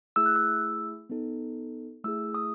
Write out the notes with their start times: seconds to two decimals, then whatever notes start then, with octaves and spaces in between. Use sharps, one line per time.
0.16 A3 E4 G#4 E6
0.26 F#6
0.36 E6
1.10 B3 D#4 A4
2.04 A3 E4 G#4 E6
2.35 D#6